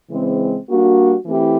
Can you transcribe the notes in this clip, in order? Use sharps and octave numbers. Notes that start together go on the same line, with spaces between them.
C#3 E3 G#3 C4
G3 A#3 D4 F#4
E3 A3 C4 E4 G4